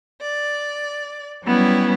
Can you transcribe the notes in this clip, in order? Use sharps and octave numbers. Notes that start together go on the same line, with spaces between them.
D5
F#3 G3 B3 C#4 E4